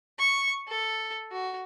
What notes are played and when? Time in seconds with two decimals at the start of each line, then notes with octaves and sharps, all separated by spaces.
0.19 C#6
0.68 A4
1.31 F#4